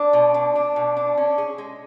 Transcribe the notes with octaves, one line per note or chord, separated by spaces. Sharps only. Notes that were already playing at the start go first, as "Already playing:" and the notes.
Already playing: D4
B2
D4
D4
B2
D4
C#4
G#4
G#3